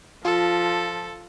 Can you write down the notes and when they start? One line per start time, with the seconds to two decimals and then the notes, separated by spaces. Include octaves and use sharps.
0.25 F3 F4 A4